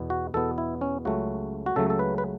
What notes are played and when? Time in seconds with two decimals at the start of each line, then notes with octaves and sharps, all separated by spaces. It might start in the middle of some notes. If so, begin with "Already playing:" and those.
Already playing: E2 B2 B3
0.10 F#4
0.34 E2 B2 B3 A4
0.58 E4
0.81 C#4
1.05 C#2 C#3 F#3 A3 F#4
1.66 F#4
1.76 C#2 C#3 F#3 A3 A4
1.90 A4
1.99 B4
2.18 B4